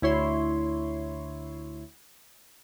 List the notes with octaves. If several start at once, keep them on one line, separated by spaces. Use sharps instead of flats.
D2 E4 C#5 C6